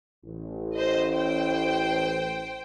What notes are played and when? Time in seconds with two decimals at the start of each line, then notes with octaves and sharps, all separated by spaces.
0.24 A1
0.73 C5 D#5
1.13 C5 G5